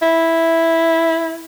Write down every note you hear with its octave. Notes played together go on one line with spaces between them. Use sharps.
E4